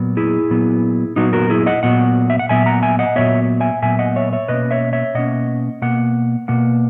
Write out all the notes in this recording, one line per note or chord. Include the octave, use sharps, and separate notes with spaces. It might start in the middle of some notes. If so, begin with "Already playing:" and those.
Already playing: A#2 F#3 B3
E4 G#4
A#2 F#3 B3
A#2 F#3 B3 D#4 F#4
F#4 A#4
E4 G#4
D#5 F#5
A#2 F#3 B3 F#5
E5
F#5
A#2 F#3 B3 E5 G#5
F#5 A#5
E5 G#5
D#5 F#5
A#2 F#3 B3 C#5 E5
E5 G#5
A#2 F#3 B3 E5 G#5
D#5 F#5
C#5 E5
C#5 E5
B2 A#3 C#4 B4 D#5
C#5 E5
C#5 E5
B2 A#3 C#4 D#5 F#5
B2 A#3 F#5
B2 A#3 F#5